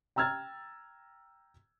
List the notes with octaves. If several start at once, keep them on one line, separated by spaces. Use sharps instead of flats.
G5 A#5 E6 F6 G#6 A6